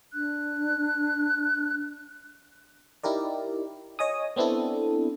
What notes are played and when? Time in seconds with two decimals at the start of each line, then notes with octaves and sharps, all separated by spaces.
0.13 D4 F#6
3.03 D#4 E4 G4 A#4 D5
3.99 C#5 D#5 G#5 D#6
4.36 B3 C4 D4 E4 A4